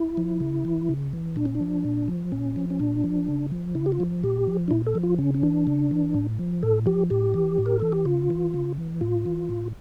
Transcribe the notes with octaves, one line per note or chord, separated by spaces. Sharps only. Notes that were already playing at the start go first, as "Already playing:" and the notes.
Already playing: E4
F3
C#3
E3
C#3
E3
A#2 D4
C#4
D4
F3
A#2
F3
A#2 C#4
F3
C#4
A#2 D4
F3
C#3
F3
C#3 E4
G4
F4
F3
A#2 G4
F3
D4
A#2 E4
A4
F3
F4
C#3 C#4
C#4
E3 D4
C#3
E3
A2
F3
A2 A4
F3 G4
A2 G4
E3
A2
A#4
E3 A4
G4
C#3 F4
E3
C#3
E3
A2 F4
E3
A2